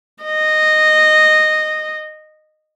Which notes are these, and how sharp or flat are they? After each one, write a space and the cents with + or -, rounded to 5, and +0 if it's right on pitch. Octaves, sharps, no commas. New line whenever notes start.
D#5 -10